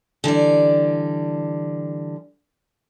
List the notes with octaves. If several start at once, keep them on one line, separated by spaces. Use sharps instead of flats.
D3 E3 G3 D5